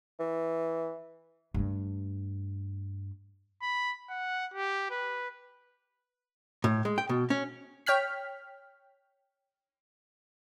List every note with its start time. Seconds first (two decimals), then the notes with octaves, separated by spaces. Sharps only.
0.19 E3
1.54 G2 A3
3.62 B5
4.10 F#5
4.54 G4
4.91 B4
6.64 A2
6.85 G#3
6.98 G5
7.09 B2
7.30 C#4
7.86 C#5 G5 F6 B6